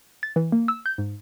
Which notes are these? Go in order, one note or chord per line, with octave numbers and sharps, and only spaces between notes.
A6
E3
A#3
E6
G6
G#2